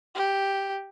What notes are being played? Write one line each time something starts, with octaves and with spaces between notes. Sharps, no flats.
G4